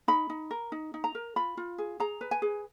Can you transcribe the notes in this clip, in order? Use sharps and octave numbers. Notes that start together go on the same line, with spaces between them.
D#4 B5
D#4
A#4
D#4
D#4
A#5
A#4
F4 B5
F4
G#4
G#4 A#5
B4
G#5
G#4